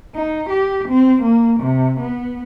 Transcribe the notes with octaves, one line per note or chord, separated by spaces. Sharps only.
D#4
G4
C4
A#3
C3
B3